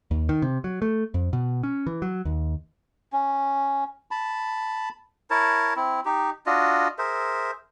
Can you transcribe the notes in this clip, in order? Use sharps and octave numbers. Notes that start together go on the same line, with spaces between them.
D#2
D#3
C3
F#3
A3
F2
B2
C#4
E3
F#3
D#2
C#4
A5 B5
E4 A#4 C#5 A5
C4 E4
D#4 G4
D4 F4 F#4 D#5
G#4 A#4 C5 E5